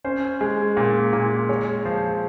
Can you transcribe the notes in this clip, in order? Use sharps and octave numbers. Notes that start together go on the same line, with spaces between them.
C#4 C5
G#3
A#2
A#2
G#3 C#5
F3 C5